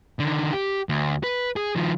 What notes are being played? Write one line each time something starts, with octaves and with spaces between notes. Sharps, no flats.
D3 D#3
G4
D2
B4
G#4
D#3 F3